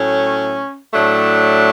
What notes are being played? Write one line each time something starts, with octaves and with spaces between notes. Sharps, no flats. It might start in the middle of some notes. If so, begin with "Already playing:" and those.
Already playing: A2 F#3 A3 C#4
A2 F#3 A3 D4